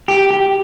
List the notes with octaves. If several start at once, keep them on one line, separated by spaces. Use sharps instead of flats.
G4
G4